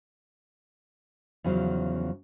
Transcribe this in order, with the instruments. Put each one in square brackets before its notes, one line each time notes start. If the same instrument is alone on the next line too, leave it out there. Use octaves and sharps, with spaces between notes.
[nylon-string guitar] E2 C#3 F3 F#3